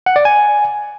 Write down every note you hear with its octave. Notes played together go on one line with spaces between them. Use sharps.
F#5
D5
G#5